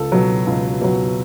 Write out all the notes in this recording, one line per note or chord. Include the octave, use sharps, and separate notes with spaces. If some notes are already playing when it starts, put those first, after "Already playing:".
Already playing: C#2 A4 A5
B2 F#3
C#2
B2 F#3